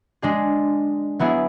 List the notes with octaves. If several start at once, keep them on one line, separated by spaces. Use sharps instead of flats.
G#3 D4 G#4
F#3 B3 E4 G#4